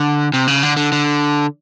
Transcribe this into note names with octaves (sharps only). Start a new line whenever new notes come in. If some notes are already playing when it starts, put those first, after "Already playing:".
Already playing: D3
C3
C#3
D3
D3
D3